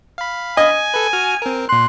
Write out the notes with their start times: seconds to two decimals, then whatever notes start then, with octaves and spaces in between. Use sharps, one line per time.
0.18 F5 B5
0.57 D#5 G#5
0.94 A4 B4
1.13 F#4 F6
1.42 C4 A#4
1.69 A#2 C6 F#6